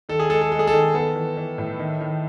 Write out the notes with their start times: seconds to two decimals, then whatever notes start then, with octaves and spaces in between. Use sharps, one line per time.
0.09 D#3 A4
0.20 G#4
0.30 G#3 A4
0.41 A4
0.52 G#3 A4
0.59 G#4
0.67 A4
0.73 D#3
0.94 B3 A4
1.15 E3
1.37 E3
1.58 A2
1.79 D#3
2.01 D#3